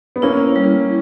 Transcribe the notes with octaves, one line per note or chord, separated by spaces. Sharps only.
B3
A#3 C#4 E4
G3